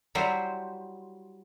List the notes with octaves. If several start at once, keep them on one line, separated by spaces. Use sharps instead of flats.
F#3 G3 E4 C5